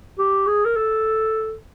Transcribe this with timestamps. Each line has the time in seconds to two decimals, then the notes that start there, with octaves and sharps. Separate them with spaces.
0.19 G4
0.47 G#4
0.65 A#4
0.76 A4